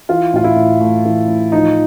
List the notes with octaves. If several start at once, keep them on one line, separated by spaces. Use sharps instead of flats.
E3 F4
A2 F4
E4
A2
A3
E3
A2
F3 D#4